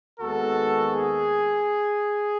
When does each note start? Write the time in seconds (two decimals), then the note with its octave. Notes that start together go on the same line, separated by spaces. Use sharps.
0.20 D#2 D#3 G#3 B3 F#4 A4
0.92 G#4